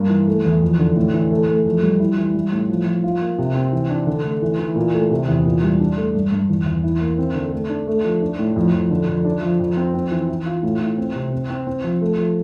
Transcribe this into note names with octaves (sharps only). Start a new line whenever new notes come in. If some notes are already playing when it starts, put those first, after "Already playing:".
Already playing: G2 A#3
E3
A3
E2
F2
D3
A2
E3
A3
A3
F2
G3
E4
E3
G3
A2
F3
F3
F4
A#3
C3
C4
E3
D4
D3
A3
E3
E3
A#2
A3
C3
E2
A#2
G3
D4
A3
G2
G2
E2
E2
E4
A#3
C4
D3
A3
D4
A3
F3
D4
A2
F2
F2
D3
F2
D4
F3
F2
C4
C4
E3
E3
F4
A2
A2
C4
C3
C4
C4
C4
F3
A3
F3